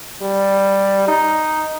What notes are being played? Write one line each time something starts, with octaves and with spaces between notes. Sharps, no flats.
G3
D#4